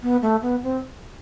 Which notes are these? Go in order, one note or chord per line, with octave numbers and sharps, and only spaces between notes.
B3
A3
B3
C4